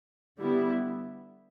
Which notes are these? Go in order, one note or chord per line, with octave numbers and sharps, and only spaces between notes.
D3 G3 B3 E4